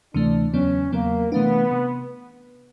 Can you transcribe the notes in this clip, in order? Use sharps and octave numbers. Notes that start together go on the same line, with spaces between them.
D2 C3 E3 A3 D4
E2 C#3 F#3 B3 C#4
E2 C#3 F#3 A#3 B3
C3 E3 A3 B3 D4
C3